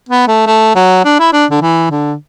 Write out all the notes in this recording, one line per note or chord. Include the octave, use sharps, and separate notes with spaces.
B3
A3
A3
F#3
D4
E4
D4
D3
E3
D3